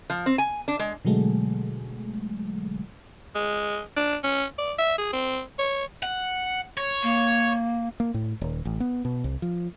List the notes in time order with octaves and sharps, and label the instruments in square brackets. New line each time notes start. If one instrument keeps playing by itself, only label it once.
[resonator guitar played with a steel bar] F3
C4
G#5
D4
G#3
[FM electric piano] B2 D3 F#3 G#3 A3
[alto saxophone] G#3
D4
C#4
D5
E5
G#4
C4
C#5
[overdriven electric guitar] F#5
C#5
[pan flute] A#3
[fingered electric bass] A#3
A2
D#1
A1
B3
B2
C2
F3